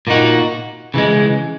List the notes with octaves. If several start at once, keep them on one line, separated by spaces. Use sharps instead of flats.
A#2 A#3 D#4 F#4
C#3 E3 G#3